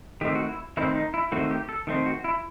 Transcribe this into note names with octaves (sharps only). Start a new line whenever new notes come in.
D#3 A3 C4 G4
F#4
E4
D#3 A3 C4 E4
D#4
E4
D#3 A3 C4 F#4
G4
A4
D#3 A3 C4
F#4
E4